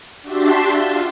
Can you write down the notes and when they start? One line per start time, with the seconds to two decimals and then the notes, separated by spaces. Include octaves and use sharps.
0.22 D4 F#4 G4 E5 A5 C6
0.69 F4